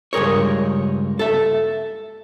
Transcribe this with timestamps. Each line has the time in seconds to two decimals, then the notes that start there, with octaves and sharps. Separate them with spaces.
0.13 C#2 G2 G#4 A#4 C#5
1.19 A4 E5